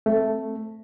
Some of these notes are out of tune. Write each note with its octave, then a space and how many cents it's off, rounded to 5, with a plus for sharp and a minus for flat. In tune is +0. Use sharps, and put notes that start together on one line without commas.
A3 +0 C4 +0